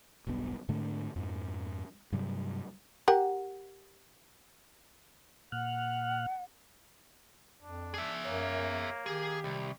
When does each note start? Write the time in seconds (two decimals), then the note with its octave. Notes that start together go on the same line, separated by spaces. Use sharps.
0.27 E1 B1 G2 B3
0.69 G#2 D3 A3 D4
1.16 F2 G#2
2.12 G2 C3 F#3 G3
3.08 G4 A#4 F#5
5.52 A#2 F#5 F6 F#6
7.62 F2 D4
7.94 G#4 E5
8.24 F#2 A#3 C#5
9.06 D#3 G4 G#4
9.44 C2